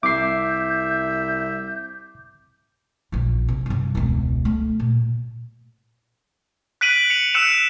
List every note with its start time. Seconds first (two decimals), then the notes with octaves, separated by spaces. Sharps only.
0.03 C2 E5 D6 G6 C7
3.12 A#1 F4
3.48 C3
3.66 G2 C3
3.95 E1 C#2
4.45 A3
4.80 A#2
6.81 F#6 B6 D7 D#7 F#7
7.10 C#7 F7
7.34 E6 F#6 C#7 E7